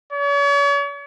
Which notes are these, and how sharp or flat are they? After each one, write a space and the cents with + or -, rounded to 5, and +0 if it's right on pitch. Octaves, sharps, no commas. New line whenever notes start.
C#5 +40